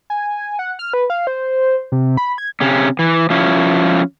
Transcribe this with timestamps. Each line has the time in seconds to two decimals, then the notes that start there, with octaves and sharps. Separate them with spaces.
0.10 G#5
0.59 F#5
0.79 F6
0.94 B4
1.10 F5
1.27 C5
1.92 C3
2.17 B5
2.38 G#6
2.61 C3 C#4
2.99 E3
3.30 F3 C#4 E4